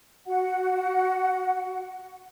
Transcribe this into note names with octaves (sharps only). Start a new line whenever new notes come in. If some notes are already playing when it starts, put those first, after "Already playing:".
F#4 F#5